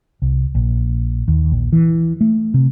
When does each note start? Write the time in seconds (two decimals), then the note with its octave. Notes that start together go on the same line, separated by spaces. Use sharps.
0.22 C2
0.55 A#1
1.28 D#2
1.52 A#1
1.73 E3
2.21 A3
2.54 C3